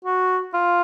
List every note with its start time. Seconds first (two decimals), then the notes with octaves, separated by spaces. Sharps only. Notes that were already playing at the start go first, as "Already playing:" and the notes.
0.05 F#4
0.54 F4